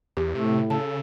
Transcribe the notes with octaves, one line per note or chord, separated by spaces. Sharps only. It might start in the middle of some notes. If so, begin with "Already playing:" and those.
E2 G4
A2 C3 A3
C#3 A4 A5